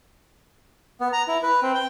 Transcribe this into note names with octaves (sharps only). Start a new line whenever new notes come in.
B3
A#5
E4
B4
C4
G5